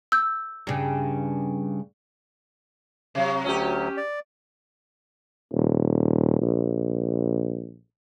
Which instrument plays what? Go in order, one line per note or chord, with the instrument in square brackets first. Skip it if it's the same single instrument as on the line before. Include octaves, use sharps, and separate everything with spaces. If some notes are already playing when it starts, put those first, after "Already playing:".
[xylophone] E6 G6
[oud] G2 C#3
[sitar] C3 F#3
[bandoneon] D2 F#3 [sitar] C#4 G4
[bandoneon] D5
[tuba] D#1
A#1